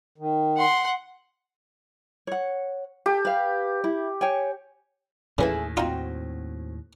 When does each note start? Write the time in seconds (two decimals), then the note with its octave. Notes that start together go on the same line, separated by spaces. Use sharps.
0.18 D#3
0.57 F#5 C6
2.27 C#5 F#5
3.06 G4 A4
3.25 B4 F5
3.84 E4
4.21 C#5 G5 G#5
5.38 D#2 A2 C#3 E3 E4 G#4 A4
5.77 C4 D#4 F4 F#4